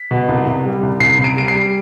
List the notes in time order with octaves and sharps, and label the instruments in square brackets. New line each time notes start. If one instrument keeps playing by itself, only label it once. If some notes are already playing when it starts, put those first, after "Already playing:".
Already playing: [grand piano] B6
B2
C2
C2
G3
C2
C2 C7
C2
D7
G3 D7
C7
G3